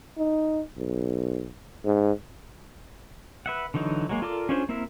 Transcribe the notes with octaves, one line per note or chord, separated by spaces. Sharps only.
D#4
B1
G#2
B4 E5 F#5
D3 E3 F#3 D#4
F#3 G#3 A#3
F4 A4 A#4 D5 D6
C#4 D4 F4 G#4 C5
A#3 C4 E4 A#4 E5